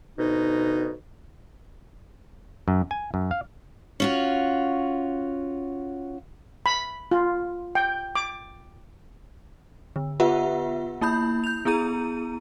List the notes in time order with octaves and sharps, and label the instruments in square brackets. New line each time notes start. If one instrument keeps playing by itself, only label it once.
[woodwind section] D2 B2 D#4
[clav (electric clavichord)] F#2
G#5
F#2
F5
[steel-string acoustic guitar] C#4 F4 F#4
[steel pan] B5
F4
G5
D6
[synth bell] D3
B3 F4 G4 B4 E5 F#5
A#3 E4 B5 G6
G6 F7
B3 E4 G#4 A#5 D#7